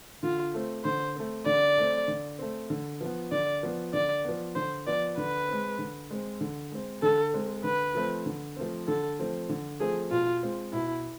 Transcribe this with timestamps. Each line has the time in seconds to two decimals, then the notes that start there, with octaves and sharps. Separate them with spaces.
0.23 D3 F4
0.54 A3 C4
0.85 D3 C5
1.16 A3 C4
1.46 D3 D5
1.77 A3 C4
2.08 D3
2.39 A3 C4
2.70 D3
3.01 F3 B3
3.32 D3 D5
3.63 F3 B3
3.93 D3 D5
4.25 F3 B3
4.55 D3 C5
4.87 F3 B3 D5
5.17 D3 B4
5.48 G#3 C4
5.79 D3
6.10 G#3 C4
6.41 D3
6.72 G#3 C4
7.02 D3 A4
7.34 G#3 C4
7.64 D3 B4
7.95 F3 A3 C4
8.26 D3
8.56 F3 A3 C4
8.88 D3 A4
9.19 F3 A3 C4
9.49 D3
9.80 F3 A3 C4 G#4
10.11 B2 F4
10.43 G#3 C4 F4
10.73 B2 E4